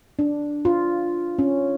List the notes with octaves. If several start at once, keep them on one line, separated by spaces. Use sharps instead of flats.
D4
F4
C#4